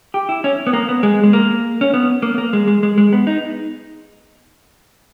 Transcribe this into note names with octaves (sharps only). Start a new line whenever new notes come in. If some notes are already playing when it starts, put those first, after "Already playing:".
G4
E4
C#4
B3
A#3
B3
G#3
G#3
A#3
C#4
B3
A#3
A#3
G#3
G#3
G#3
G#3
B3
D#4